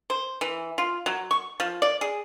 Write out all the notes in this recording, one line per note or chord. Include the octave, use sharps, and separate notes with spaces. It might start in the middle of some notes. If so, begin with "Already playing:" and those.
C5
E3
F4
F#3
C#6
F3
D5
G#4